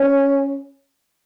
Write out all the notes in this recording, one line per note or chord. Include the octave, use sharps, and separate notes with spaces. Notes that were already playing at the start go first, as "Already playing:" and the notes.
Already playing: C#4